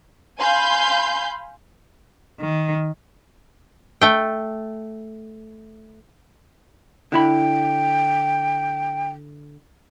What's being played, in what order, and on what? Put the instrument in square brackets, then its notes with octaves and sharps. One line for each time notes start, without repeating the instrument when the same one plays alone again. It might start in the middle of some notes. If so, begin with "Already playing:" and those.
[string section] F5 G#5 B5 C6 G6
[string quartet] D#3
[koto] A3 G5
[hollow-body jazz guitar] D3 E4 B5 [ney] G5